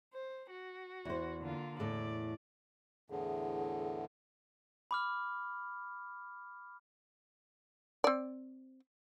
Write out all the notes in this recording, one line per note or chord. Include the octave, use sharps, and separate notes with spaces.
C5
F#4
E2 C5
D3 A#3 F4
E2 A2 A4 D5
E2 A2 D3 G#4
B5 D6 F6
C4 D5